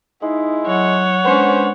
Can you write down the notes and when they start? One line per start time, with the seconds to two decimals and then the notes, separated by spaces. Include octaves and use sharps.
0.22 G#3 D#4 E4
0.67 F#3 C#5 F#5
1.25 G#3 B3 C#4 D4 C5